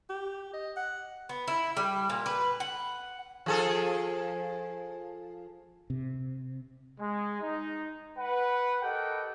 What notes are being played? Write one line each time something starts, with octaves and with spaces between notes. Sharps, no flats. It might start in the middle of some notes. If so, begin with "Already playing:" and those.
G4
D#5
F#5
B3
E4
G3
A#2
B4
F#5
F3 G#4 A4
C3
G#3
D#4 D#5
B4 F#5
G4 A4 A#4 D#5 F#5 G5